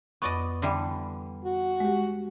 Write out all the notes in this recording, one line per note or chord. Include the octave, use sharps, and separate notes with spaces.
F2 B3 D5 D#5 C#6
D3 E3 G3
F#4
G#3 G4